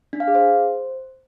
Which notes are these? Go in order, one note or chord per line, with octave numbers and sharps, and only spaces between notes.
D4
F5
G#4
C5